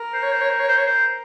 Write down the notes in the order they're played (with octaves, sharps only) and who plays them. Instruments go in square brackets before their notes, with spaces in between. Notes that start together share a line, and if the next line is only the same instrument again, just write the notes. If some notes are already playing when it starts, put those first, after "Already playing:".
Already playing: [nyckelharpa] A#4
[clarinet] C5
C#5
C5
C#5
C5
C#5
C5
C#5
C5